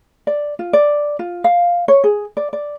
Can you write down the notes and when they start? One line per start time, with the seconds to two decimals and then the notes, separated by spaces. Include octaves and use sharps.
0.27 D5
0.59 F4
0.73 D5
1.19 F4
1.44 F5
1.88 C#5
2.04 G#4
2.37 D5
2.53 D5